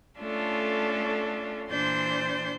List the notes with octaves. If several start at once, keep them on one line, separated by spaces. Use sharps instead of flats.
A3 C#4 D4 F4 A4
A#2 E3 D4 C5 C6 G6